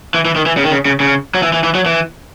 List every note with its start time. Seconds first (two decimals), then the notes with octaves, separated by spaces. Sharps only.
0.14 E3
0.25 E3
0.36 D#3
0.46 E3
0.57 C#3
0.64 D#3
0.71 C#3
0.86 C#3
1.00 C#3
1.35 F#3
1.43 E3
1.53 E3
1.64 E3
1.75 F#3
1.86 E3